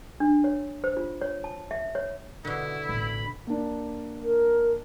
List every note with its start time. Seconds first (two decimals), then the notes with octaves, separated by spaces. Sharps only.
0.20 D4
0.44 C#5
0.84 C5
0.97 F4
1.21 C#5
1.44 A5
1.71 E5
1.95 C#5
2.45 B2 D3 E4
2.89 A1 B5
3.47 A#3 D4
4.24 A#4